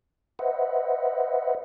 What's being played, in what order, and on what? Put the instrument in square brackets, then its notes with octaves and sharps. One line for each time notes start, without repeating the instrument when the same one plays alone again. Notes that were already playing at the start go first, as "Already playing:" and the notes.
[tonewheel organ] B4 C5 D#5 E5 F#5